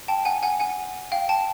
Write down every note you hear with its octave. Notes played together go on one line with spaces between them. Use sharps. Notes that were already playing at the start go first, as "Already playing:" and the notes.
G5 A5
F#5 G#5
F#5 G#5
F#5 G#5
F5 G5
G5 A5